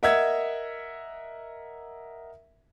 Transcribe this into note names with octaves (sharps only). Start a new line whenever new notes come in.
A#4 D#5 E5 F#5 E6 G#6